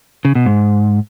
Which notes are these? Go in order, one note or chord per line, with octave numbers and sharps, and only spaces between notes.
C#3
B2
G#2